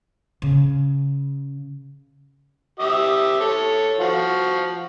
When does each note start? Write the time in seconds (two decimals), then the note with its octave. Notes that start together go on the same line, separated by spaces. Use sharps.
0.42 C#3
2.79 G4 E5 D#6
3.40 A4 C#5
4.00 F3 F#4